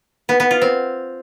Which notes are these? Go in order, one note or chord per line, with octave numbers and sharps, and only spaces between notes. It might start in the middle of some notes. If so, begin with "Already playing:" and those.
B3
B3
F4
C4